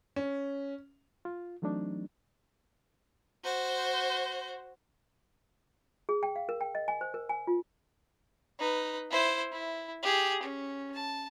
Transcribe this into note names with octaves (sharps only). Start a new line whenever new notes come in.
C#4
F4
E3 F#3 A3 C4 D4 D#4
F#4 C5
G#4
G5
F5
A#4
G5
D#5
G#5
C5
A#4
G#5
F4
D#4 B4
E4 C5
E4
G4 G#4
C#4
A5